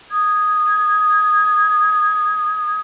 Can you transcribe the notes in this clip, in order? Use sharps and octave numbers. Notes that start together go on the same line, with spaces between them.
D#6 G#6